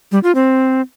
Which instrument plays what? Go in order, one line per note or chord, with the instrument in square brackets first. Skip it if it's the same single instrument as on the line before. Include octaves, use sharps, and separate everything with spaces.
[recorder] G3
F4
C4